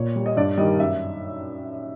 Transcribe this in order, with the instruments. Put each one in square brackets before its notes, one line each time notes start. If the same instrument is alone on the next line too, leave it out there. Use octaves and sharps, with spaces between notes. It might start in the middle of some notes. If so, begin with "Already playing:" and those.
Already playing: [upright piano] A#2 C#5
G3
D#5
G2 D5
D#3 G3 D#5
F#2 E5